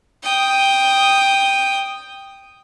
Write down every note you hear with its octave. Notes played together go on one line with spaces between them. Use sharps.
G5 D#6